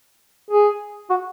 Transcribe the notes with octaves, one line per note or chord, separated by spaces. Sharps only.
G#4
F#4